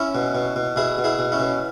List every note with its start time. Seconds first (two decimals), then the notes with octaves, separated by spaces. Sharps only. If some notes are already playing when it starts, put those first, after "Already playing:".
Already playing: C#4 E4
0.15 B2
0.35 B2
0.56 B2
0.76 B2 E4 G#4
0.98 B2
1.04 E4 G#4
1.19 B2
1.32 C#4 E4
1.40 B2